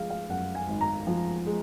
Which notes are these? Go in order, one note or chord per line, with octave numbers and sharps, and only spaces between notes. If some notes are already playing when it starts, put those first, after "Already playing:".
Already playing: F3 G#3 F5
F5
F#2 F#5
G#5
G#1
A#5
F3
G#3